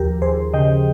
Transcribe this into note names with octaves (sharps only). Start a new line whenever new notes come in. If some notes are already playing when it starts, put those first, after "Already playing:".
Already playing: D#2 F3 G4 A#4
D#2 G#4 C5
C#3 D#5 G5